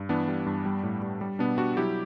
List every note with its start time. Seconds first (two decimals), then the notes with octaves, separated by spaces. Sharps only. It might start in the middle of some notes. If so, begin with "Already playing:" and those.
Already playing: G2
0.09 E3 B3 D4
0.28 G3
0.46 G2
0.65 G3
0.83 A2
1.02 G3
1.21 G3
1.39 B2 B3 D4
1.58 G3 D4 F#4
1.77 F#3 E4 G4